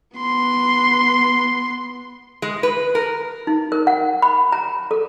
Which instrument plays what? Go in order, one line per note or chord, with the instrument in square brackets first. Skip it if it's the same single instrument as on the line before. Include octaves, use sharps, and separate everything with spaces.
[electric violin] B3 C6
[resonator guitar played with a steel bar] G#3
B4
A#4
[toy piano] D#4
A#4
F#5
B5
A#5
A4